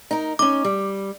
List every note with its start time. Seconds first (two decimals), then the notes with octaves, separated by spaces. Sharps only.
0.11 D#4 A#4
0.39 C#4 D#4 D6
0.65 G3